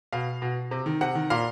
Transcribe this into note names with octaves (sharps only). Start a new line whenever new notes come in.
B2 F5
B2
C3
D#3
C3 F#5
D#3
A#2 F5